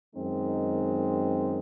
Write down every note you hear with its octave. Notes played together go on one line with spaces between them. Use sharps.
F#2 D#3 G#3 C4 D#4